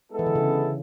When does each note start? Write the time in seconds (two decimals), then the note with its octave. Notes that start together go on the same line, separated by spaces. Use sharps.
0.11 G#3 B3 E4 A4
0.19 E3
0.26 D3
0.35 C#3